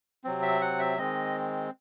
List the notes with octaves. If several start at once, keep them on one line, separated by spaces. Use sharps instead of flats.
C3 F#3 C4
E5
F#5
E5
D#3 G#3 C4 D#5